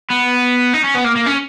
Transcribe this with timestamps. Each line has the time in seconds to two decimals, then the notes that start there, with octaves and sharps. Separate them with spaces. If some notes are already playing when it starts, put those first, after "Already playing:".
0.11 B3
0.74 D#4
0.84 C#4
0.95 B3
1.05 A#3
1.16 A#3
1.27 C#4